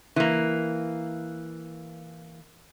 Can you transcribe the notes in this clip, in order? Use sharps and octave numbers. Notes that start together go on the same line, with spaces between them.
E3 A#3